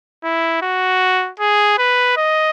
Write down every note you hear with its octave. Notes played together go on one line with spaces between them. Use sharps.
E4
F#4
G#4
B4
D#5